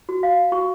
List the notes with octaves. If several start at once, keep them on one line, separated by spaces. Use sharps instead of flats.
F#4
F5
F#4 C#6